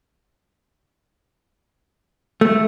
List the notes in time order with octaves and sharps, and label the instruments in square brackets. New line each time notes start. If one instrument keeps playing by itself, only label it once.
[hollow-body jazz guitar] A3